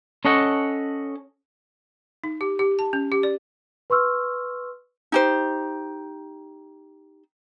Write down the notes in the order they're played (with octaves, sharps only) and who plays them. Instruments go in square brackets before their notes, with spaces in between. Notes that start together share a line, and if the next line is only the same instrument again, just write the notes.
[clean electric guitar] C#4 A4 C#5 D#5 F#5
[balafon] D#4
G4
G4
A5
C#4
G4
D5
[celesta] B4 C6 C#6 E6 F6
[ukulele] D#4 G4 C5